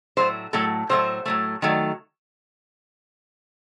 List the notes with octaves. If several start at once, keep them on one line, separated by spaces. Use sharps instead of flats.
A2 F#3 A3 C5
A2 F#3 A3 A4
A2 F#3 A3 C5
A2 F#3 A3
D#3 F#3 A3